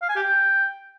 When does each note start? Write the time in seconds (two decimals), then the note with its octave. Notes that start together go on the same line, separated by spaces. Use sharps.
0.02 F5
0.09 G#5
0.15 G4
0.22 G5